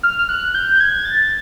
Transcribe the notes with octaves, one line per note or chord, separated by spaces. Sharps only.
F6
F6
F#6
G6
G#6
A6